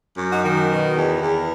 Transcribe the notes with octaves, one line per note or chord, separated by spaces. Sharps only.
F#2
D#4 F#4
D#3
B2
E2
E2